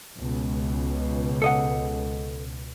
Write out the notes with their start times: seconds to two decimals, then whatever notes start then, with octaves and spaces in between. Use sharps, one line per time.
0.17 C#2 B2
1.42 A4 D#5 F#5